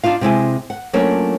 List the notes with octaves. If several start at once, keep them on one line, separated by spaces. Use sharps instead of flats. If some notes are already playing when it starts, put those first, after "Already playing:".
D4 D#4 F4 F5
C3 G#3 E4 G#5
F#5
F#3 A3 A#3 C#4 D4 F4